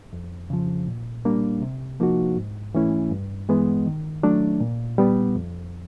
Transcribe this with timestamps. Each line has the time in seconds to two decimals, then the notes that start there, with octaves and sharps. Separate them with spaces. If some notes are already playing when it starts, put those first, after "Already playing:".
0.13 F2
0.50 C#3 F3
0.88 A#2
1.25 G3 A#3 D4
1.62 C3
2.00 F3 A#3 D#4 F#4
2.37 G#2
2.74 E3 A3 C#4 E4
3.11 G2
3.49 E3 G#3 B3
3.86 D#3
4.23 F#3 A3 D4
4.60 A#2
4.98 G3 B3
5.35 F2